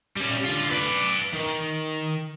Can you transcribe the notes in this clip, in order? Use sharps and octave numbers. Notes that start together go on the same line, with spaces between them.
G3 C#4
D3 F4
B4 D5
D#3